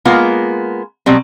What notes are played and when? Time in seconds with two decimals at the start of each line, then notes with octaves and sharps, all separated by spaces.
0.05 G#3 A#3 B3 F4
1.06 B2 F#3 G3 C4